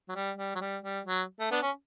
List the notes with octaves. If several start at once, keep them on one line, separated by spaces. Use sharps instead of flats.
F#3
G3
G3
F#3
G3
G3
F#3
A3
B3 D4
C#4